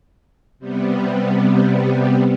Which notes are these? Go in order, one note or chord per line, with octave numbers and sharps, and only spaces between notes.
C3 G3 B3